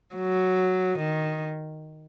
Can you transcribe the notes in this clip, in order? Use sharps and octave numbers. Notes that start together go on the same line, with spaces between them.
F#3
D#3